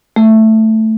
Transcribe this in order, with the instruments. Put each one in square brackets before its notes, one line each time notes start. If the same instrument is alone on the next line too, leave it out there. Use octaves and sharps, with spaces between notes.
[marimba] A3